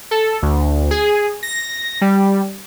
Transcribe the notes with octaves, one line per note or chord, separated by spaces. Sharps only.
A4
D2
G#4
A#6
G3